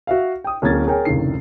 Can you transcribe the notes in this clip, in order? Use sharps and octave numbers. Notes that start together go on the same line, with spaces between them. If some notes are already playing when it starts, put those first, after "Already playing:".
F#4 E5 F5
G5 D#6
D1 A#3 C#4 G#4 G#6 A6
G#4 A#4 C#5 G5 G#5
F1 C#2 A2 D#3 C7